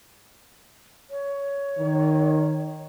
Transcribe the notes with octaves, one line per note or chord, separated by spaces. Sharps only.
C#5
D#3